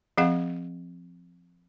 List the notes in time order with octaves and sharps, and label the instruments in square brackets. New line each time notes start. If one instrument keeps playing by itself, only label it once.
[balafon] F3 C4 G#4 F5 F#5